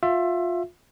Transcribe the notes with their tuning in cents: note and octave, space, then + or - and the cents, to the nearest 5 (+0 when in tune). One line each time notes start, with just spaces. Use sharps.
F4 +20 E5 +20